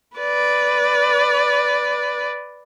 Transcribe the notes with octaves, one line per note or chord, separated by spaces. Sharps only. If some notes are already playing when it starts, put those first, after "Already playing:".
B4 D5